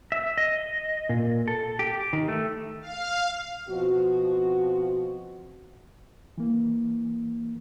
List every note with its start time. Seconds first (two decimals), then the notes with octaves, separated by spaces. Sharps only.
0.12 E5
0.38 D#5
1.09 A#2
1.48 A4
1.79 G4
2.13 D#3
2.28 A3
2.82 F5
3.68 B2 F3 C4 F#4
6.38 E3 A#3